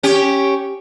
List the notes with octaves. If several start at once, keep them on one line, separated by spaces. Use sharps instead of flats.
C#4 G4